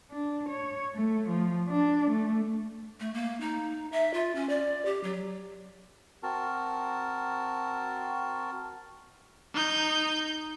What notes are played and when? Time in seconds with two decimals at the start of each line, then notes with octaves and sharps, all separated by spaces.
0.11 D4
0.49 C#5
0.94 A3
1.28 F3
1.68 D4
2.10 A3
3.00 A3
3.14 A#3
3.41 D#4
3.92 E5
4.14 F4
4.35 C#4
4.49 D5
4.85 G4
5.03 F#3
6.23 C4 F#4 A#4 A5
9.54 D#4 G6